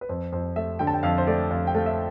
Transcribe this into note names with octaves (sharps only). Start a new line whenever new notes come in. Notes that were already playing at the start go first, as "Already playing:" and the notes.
B4
F2 C5
F2 C5
A3 E5
D3 G5
A5
G5
F2 F5
C5
A3 D5
F2 F5
G5
A3 F5
E5